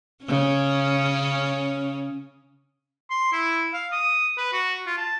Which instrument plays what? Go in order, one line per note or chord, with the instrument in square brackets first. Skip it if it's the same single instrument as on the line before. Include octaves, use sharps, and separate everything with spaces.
[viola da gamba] C#3 C#4
[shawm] C6
E4
F5
D#6
B4
F#4
F4
A5